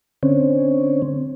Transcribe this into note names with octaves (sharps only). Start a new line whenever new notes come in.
D3 C4 C#4